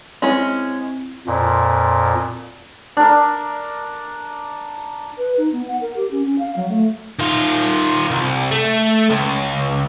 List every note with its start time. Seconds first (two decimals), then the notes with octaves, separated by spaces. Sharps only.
0.22 G#3 C4 C#4 E4
1.27 F2 A#2
2.97 D4 A#4
5.18 B4
5.38 D#4
5.52 B3
5.68 F#5
5.81 A#4
5.96 G4
6.11 C#4
6.26 C#4
6.39 F5
6.57 F#3
6.69 A3
7.19 D#3 F4
8.11 C2
8.51 A3
9.10 C#2